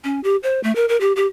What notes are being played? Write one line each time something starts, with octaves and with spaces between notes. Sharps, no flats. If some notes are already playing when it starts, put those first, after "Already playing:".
C#4
G4
C5
A3
A#4
A#4
G4
G4